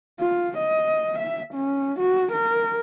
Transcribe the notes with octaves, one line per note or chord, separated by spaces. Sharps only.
F4
D#5
E5
C#4
F#4
A#4